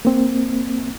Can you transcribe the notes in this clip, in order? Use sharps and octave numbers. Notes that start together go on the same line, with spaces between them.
A#3 C4